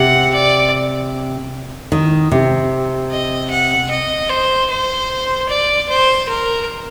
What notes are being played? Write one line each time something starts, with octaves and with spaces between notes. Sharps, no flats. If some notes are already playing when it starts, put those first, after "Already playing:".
Already playing: C3 F#5
D5
D#3
C3
D#5
F#5
D#5
C5
C5
D5
C5
A#4